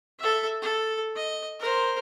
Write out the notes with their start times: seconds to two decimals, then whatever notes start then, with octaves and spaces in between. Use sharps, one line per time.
0.19 A4 E5
0.62 A4
1.15 D#5
1.60 A#4 C5